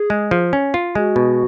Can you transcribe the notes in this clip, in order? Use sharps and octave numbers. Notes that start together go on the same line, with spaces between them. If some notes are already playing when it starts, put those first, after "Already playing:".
Already playing: G#4
G#3
F3
C#4
F4
G#3 F#4
B2